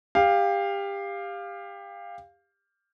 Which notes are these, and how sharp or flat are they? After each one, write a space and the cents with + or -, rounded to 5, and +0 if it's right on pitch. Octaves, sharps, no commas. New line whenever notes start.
G4 +25 F5 +0